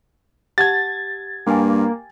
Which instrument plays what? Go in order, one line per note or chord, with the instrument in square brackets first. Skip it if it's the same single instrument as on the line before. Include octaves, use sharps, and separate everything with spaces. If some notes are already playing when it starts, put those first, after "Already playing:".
[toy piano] G4 F#5 A5 [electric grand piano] G#6 A6
[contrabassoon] G2 [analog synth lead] A#3 [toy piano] G5 G#5